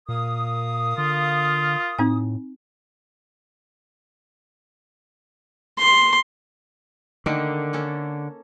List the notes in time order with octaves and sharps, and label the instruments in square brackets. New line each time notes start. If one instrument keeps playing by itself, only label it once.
[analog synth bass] A#2 [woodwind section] A#4 F5 D#6
[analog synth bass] D3 [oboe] F4
[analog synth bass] A2 [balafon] C4 D#4 G#5
[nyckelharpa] C6
[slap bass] D3 [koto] D#3 A3 A#3
[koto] A#3 C#4 A4